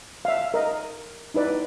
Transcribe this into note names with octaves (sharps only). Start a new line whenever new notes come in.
E5 F5
A#4 D#5
D#4 E4 B4 D5